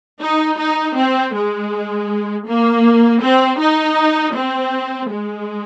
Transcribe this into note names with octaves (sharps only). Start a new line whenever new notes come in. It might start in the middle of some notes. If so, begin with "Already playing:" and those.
D#4
D#4
C4
G#3
A#3
C4
D#4
C4
G#3